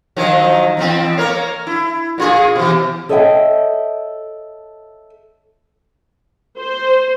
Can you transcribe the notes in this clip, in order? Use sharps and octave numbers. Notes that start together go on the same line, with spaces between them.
D#3 F3 F#3
E2 F3 C4
A#3 A#4 C#5
E4
A#2 F4 G#4
B2 E3
A4 C#5 D#5 E5 F#5 G5
C5